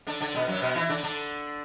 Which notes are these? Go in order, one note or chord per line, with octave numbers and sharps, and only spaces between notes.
D3 D4
D3 D4
B2 B3
F#2 F#3
B2 B3
E3 E4
D3 D4
D3 D4